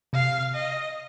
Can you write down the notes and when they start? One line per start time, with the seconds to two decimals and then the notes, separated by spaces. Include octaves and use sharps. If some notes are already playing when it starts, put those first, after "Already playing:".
0.13 C3 F5
0.55 D#5